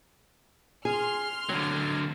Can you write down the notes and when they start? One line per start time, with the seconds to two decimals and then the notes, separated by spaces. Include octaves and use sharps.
0.85 G#4 C6 F6
1.49 D3 F#3 F#5